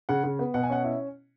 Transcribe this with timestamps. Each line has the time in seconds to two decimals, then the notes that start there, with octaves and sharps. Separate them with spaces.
0.09 C#3 F#5
0.24 C#3
0.39 B3
0.54 B2 F#5
0.63 G#5
0.70 C#4 F#5
0.84 E4